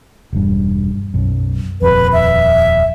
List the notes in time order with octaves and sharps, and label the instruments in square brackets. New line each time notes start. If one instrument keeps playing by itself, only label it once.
[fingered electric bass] E1 G2
B1 F#2
[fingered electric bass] D#1 G#1 F2 [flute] B4
[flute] E5